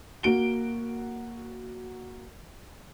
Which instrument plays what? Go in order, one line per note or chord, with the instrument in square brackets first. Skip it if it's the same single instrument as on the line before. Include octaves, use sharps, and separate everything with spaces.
[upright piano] A#3 F#4 D7 G7